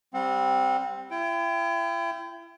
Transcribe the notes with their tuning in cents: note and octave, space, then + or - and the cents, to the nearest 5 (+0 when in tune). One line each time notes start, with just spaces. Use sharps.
G3 +0 C4 +0 F#5 -35
E4 +40 G5 +0